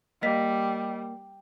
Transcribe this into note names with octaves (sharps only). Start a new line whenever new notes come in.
G3 A#3 D#5 B6